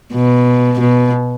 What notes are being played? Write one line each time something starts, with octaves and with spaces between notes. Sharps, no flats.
B2
B2